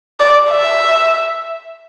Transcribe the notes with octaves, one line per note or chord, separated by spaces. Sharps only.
D5
E5